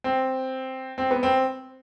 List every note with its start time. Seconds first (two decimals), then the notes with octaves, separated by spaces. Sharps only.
0.04 C4
0.98 C4
1.11 B3
1.23 C4